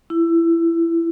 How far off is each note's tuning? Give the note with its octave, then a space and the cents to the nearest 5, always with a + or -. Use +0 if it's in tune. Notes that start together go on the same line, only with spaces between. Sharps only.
E4 +20